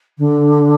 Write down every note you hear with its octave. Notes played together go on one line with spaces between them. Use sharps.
D3